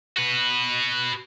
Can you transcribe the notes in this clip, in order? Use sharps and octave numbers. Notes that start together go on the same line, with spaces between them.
F#4 B4